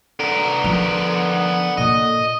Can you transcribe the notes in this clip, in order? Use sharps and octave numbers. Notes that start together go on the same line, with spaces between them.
D3 B3 A#4
F3
A#2 D#5